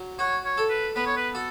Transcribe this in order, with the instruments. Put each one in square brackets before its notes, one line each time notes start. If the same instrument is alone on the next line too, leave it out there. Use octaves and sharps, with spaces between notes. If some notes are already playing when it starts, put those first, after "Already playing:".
Already playing: [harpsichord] F#3
[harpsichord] F#4 [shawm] C#5
[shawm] C#5
[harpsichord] A4
[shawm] B4
[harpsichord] B3 [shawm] B4
[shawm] C#5
B4
[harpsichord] F#4 [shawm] A4